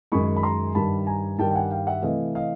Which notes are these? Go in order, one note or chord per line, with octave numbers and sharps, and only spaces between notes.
F#2 D#3 G#3 B5 C#6
B5
A#5 C6
G2 D#3 G3 A5 B5
G#5 A#5
G2 D#3 G3 G5 A5
G5
F#5 G#5
F5 G5
E5 F#5
C3 E3 A3 D#5 F5
D#5 F5